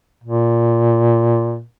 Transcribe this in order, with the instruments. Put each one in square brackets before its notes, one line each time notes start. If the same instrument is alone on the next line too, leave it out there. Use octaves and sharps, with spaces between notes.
[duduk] A#2